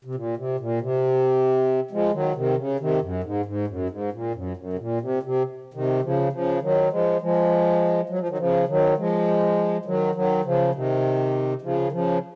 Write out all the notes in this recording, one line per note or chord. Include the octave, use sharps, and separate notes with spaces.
C3
A#2
C3
A#2
C3
F3 G#3
D#3 F#3
C3 D#3
C#3
C3 D#3
F#2
G#2
G#2
F#2
G#2
A#2
F#2
F#2
C3
A#2
C3
C3
C3 D#3
C#3 F3
C#3 F3
D#3 F#3
F3 G#3
F3 G#3
F#3
F3
D#3 F#3
C#3 F3
D#3 F#3
F3 G#3
D#3 F#3
D#3 F#3
C#3 F3
C3 D#3
C#3 F3
D#3
C#3 F3